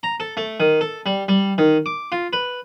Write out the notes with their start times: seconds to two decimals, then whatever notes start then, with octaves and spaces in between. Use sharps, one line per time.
0.03 A#5
0.20 A4
0.37 A3
0.60 D#3
0.81 A4
1.06 G3
1.28 G3
1.58 D#3
1.86 D6
2.12 F4
2.33 B4